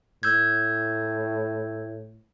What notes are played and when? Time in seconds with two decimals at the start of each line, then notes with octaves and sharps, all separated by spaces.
0.23 A2 E6 G6 G#6